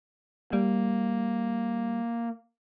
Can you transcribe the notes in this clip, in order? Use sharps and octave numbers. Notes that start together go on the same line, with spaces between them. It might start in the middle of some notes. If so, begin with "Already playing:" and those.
G3 A#3